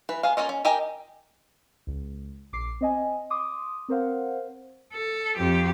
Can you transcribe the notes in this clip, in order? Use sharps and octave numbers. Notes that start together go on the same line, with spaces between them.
E3 B4
B3 G#4 F5
A#3 C#4 F4 D#5
C#4
G4 A#4 D#5 G5 G#5
C#2
A#1 D6 C7
C4 D#5 G#5
C6 D6 D#6
C4 A#4 C5 F5 F#5
A4
F2 G4